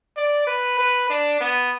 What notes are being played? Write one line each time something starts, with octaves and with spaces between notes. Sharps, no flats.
D5
B4
B4
D4
B3